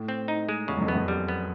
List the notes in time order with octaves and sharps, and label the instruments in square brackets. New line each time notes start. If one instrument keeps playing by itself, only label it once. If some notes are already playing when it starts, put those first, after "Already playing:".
Already playing: [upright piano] A2
[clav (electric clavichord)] C4
D#4
G#3
[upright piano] E2 [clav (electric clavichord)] C#3
[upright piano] F#2
F2
[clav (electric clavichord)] B3
[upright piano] F2
[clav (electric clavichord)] G3
B3